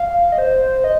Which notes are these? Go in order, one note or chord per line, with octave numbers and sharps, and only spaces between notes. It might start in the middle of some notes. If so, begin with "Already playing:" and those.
Already playing: F5
D#5
C5
D#5